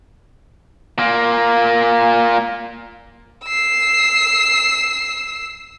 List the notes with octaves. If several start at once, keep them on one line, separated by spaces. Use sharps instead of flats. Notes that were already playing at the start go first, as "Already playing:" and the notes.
A#2 A#3
E6 C7